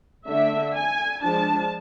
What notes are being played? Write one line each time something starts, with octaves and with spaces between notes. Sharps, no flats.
D3 A3 D4 E5
G#5
F3 G#3 D4 A5